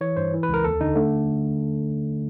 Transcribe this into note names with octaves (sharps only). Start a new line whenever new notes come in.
E3 C#5
G2 C5
E3
B4
C#2
A#4
D#2 A4
D3 D#4
D3 A3